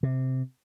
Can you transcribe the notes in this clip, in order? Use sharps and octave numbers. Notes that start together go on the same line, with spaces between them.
C3